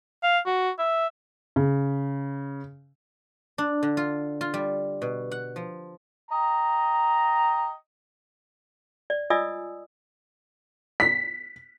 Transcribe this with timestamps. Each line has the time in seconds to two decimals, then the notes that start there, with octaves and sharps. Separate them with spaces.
0.23 F5
0.46 F#4
0.79 E5
1.56 C#3
3.58 D4
3.83 D3
3.97 F4
4.41 F4
4.54 G3
5.02 B2
5.31 F#5
5.56 F3
6.31 D#5 G5 A#5
9.10 D5
9.30 F4 D5 D#5 G#5 D#6 E6
11.00 B6